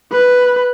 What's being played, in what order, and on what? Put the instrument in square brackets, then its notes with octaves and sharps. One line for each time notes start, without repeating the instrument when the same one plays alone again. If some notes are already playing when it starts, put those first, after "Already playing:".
[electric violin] B4